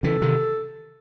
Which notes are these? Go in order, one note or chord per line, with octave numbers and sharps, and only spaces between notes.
C#3 E3 A4
C3 D#3